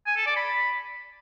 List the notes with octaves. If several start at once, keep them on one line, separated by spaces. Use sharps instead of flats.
G#5
A4
D5
B5